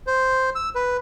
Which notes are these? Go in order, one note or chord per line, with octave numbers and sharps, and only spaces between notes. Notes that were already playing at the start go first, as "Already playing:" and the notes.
C5
E6
B4